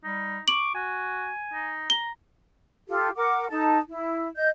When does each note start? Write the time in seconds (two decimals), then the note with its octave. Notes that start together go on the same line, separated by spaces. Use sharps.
0.04 G3 D#4
0.48 C#6 D6 F#7
0.75 F#4 G#5
1.54 D#4
1.90 A#5 G7
2.88 F4 G4 A4
3.16 A#4 F#5 D6
3.50 D#4 A4 A5
3.89 E4
4.36 D#5 G6